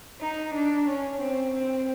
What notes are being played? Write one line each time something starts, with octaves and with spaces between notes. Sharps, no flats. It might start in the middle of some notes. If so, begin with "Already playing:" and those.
D#4
D4
C#4
C4
C4